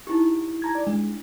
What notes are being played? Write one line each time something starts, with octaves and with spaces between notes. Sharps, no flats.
D#4 E4 G4
A5 A#5 G#6
D5
G#3 D4